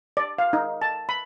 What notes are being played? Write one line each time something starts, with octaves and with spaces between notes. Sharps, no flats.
D5
F5
D#4
A5
B5